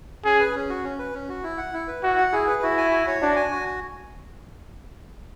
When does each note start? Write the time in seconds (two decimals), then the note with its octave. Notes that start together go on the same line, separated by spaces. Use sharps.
0.25 C#4 G#4
0.40 B4
0.55 C#4
0.69 F#4
0.84 C#4
0.99 B4
1.14 C#4
1.29 F#4
1.43 E4
1.58 F#5
1.73 E4
1.88 B4
2.02 E4 F#4
2.18 F#5
2.32 E4 G#4
2.47 B4
2.63 E4 F#4
2.78 G#5
2.92 F#4
3.07 C#5
3.22 D4 F#4
3.36 G#5
3.51 F#4